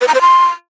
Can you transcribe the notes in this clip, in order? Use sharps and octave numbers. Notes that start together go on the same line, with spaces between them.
B4
A#5
C5
C6